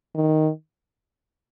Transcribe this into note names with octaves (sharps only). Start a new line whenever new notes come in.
D#3